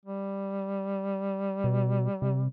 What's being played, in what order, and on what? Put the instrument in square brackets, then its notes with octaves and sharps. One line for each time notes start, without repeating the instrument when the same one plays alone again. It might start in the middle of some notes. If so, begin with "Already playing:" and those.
[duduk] G3
[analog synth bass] B2
C3